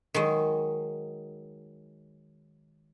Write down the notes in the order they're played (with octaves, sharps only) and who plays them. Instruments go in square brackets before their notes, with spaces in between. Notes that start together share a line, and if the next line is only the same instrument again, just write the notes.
[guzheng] D#3 F#3 G#3